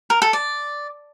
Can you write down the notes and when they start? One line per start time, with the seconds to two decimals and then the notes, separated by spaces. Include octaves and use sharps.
0.10 A#4
0.22 A4
0.33 D5